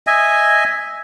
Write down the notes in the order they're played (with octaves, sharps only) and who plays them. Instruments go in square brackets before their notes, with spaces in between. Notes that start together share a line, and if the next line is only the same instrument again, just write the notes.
[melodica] D#5 E5 G#5